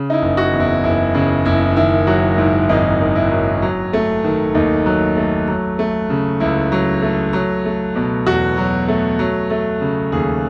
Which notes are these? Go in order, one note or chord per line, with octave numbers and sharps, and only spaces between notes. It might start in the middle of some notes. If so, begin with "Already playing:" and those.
Already playing: C#3
D#4
E4
F#1
F#4
E2
E4
F#1 E4
C#3 E4
F#1 E4
D#3 E4
F#3 F#4
G#2 E4
G#1 D#4
D#3
E4
F#3
F#3
A3
D#3
D#2 D#4
F#3
A3
F#3
A3
C#3
C#2 E4
F#3
A3
F#3
A3
B2
E2 F#4
F#3
A3
F#3
A3
C#3
D#2 G#4